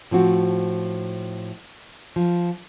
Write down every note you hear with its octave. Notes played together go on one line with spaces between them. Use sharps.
A2 F3 C4 F#4
F3